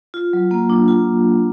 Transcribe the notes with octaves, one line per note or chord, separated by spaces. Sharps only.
F4
F#3
A#3
D4
F4